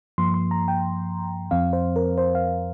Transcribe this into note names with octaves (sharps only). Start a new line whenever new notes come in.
G2 F3 A#3 C6
C6
A#5
G5
F2 F3 C4 F5
C5
A#4
C5
F5